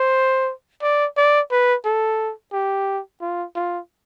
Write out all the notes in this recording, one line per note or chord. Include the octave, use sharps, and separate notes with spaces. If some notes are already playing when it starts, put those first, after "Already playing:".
Already playing: C5
D5
D5
B4
A4
G4
F4
F4